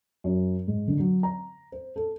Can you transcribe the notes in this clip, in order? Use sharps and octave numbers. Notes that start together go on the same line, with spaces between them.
F#2
G#2
D3
F#3
A#5
C5
A4